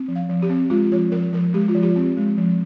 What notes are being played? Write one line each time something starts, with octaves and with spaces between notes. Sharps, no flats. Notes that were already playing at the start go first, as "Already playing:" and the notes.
Already playing: C4
F3
F5
F3
G4
C4
G#3 F4
F3 C#5
F3 A#4
F3 A#4
G#3 G4
F4
F3
G4
C4
G#3
F3